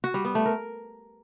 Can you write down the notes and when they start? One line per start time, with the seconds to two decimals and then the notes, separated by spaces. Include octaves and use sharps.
0.04 F#4
0.14 G3
0.25 B3
0.35 A3
0.46 A#4